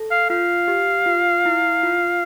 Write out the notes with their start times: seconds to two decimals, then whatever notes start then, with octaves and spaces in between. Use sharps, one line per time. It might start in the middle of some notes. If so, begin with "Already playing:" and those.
Already playing: A4
0.11 F5
0.30 F4 F5
0.68 G4
1.06 F4
1.45 E4
1.83 F4